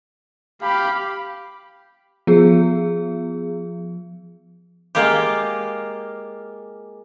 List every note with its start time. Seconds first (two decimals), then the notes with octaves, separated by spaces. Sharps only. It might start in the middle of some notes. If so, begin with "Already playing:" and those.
0.62 G4 F5 B5
2.27 F3 B3 G#4
4.95 G#3 A#3 F4 G4